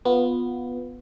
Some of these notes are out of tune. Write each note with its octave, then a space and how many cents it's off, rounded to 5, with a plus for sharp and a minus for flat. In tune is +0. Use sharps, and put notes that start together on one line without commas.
B3 +0 F4 +15